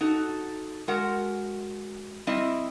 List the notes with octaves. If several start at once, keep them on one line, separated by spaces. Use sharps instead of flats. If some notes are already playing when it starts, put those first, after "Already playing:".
D#4 F#4 A4
G#3 F#4 A#4 F#5
G3 C4 E4 D#5 E5